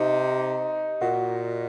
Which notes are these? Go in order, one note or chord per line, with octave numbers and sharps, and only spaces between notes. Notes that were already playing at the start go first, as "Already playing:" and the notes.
Already playing: C3 D#4
A#2 F#4